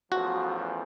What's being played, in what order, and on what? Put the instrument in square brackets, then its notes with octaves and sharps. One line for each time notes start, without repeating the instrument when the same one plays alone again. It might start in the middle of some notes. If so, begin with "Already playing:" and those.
[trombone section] A1 E2 F3 [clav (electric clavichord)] F#4